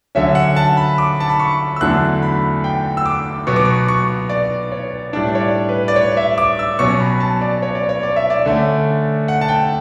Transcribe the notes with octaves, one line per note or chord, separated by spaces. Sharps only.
D3 F#3 C#4 E5
F#5
A5
B5
D6
A5
B5
C#6
E6
E2 D3 F#3 A3 D4 F#6
B5
G5
E6
D6
B2 F#3 B3 C#6
D6
C#6
C#6
D5
C#5
A2 G3 D4 D5
C#5
D5
B4
D5
C#5
E5
D6
E6
B2 F#3 C#4 C#6
B5
A5
D5
C#5
D5
C#5
D5
E5
D5
D3 A3 C#4
F#5
A5
G5